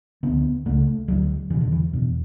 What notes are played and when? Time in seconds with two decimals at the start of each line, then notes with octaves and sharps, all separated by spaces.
0.23 D2 D3 B3
0.65 C#2 C#3 A3
1.08 D2 D3 F#3
1.50 E2 E3
1.54 B2
1.61 D3
1.72 E3
1.93 E2 B2